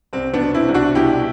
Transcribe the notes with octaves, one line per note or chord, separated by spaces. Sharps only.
C2 C4
B3 D4
B2
C4 E4
C2
D4 F#4
B2 E4 G4